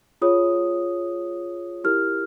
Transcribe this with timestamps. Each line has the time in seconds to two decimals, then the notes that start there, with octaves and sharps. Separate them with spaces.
0.22 F4 G#4 C#5 D#6
1.84 E4 G4 A#4 F6